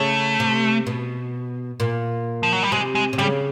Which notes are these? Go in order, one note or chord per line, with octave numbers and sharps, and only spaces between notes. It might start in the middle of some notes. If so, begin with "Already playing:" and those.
Already playing: C#3 A3
C3
B2
A#2
F3
F#3
G3
C3 G#3
G#3
C3
C#3 G3